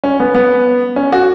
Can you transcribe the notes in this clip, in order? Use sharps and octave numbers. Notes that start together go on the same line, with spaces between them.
C#4
B3
B3
C#4
F#4